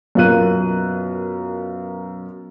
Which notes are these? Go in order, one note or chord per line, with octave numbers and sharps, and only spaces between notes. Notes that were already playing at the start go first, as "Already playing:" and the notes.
F#2 B2 F4 A#4 F#6 D#7